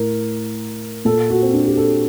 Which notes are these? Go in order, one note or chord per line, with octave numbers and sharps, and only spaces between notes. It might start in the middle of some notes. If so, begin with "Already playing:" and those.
Already playing: A2 A#4
A#2 A4
F#4
C4
D4
G4
A4